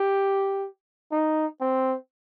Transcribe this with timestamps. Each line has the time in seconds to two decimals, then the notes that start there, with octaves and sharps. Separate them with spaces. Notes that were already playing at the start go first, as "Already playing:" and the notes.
Already playing: G4
1.12 D#4
1.61 C4